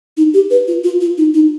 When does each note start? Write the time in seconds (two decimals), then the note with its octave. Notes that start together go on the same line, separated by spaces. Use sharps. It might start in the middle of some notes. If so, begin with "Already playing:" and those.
0.17 D#4
0.34 G4
0.51 B4
0.68 F4
0.84 F4
1.01 F4
1.18 D#4
1.34 D#4